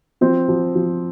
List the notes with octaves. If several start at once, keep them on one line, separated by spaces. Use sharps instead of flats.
F3 C4
F3
F3